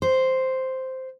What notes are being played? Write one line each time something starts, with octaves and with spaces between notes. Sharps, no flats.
C5